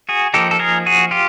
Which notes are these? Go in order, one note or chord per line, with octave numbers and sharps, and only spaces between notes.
F#4 G#4
F3 A#3 D#4 G4 A4
A4
G#4 A#4
F#4 G#4
F4 G4